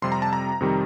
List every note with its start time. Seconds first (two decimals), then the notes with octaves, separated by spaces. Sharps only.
0.02 F2 C3 G3 C6
0.12 A#5
0.22 A5
0.33 A#5
0.60 F2 C3 D#3 G3